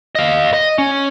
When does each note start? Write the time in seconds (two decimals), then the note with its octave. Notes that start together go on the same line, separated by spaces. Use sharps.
0.15 D#5 F5
0.53 D#5
0.78 C#4